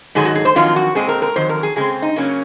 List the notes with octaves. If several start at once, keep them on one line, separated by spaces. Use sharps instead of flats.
G#2 D#3 F#3 G#4
F#4
G#4
C5
F2 D#3 F#3 F4
F#4
A#2 G#3 C4 G#4
A#4
A#4
F2 D#3 F#3 C5
A#4
G#4
C#3 G#3 C4 G#4
D#4
C#3 F#3 A#3 C#4